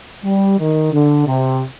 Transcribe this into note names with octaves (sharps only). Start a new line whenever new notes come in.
G3
D#3
D3
C3